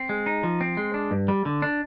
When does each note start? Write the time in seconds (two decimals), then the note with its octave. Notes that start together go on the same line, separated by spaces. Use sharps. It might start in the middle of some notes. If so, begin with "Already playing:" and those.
Already playing: C4
0.09 G#3
0.26 D#4
0.43 F3
0.61 C4
0.77 G#3
0.94 D4
1.11 G2
1.28 G3
1.45 D3
1.62 D4